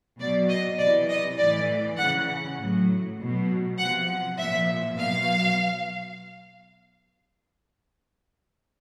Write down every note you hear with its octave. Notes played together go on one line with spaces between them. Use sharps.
B2 F#3 D5
D#5
C3 E3 D5
D#5
A2 E3 D5
C#3 E3 F#5
A2 F#3
B2 F#3
C3 F3 F#5
A#2 F3 E5
B2 F#3 F5